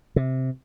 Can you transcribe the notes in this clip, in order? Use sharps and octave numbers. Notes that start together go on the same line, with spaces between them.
C3